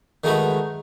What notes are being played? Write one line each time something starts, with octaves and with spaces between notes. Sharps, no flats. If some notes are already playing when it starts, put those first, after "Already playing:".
D#3 G#3 A3 D#4 F#4 B4